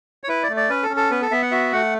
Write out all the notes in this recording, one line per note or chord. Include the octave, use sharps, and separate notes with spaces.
C#5
E4 B4
D5
A3
D5
C#4 B4
A4
C#4
A4
B3 B4
A4
B3 E5
F#5
F#4 E5
A3 F#5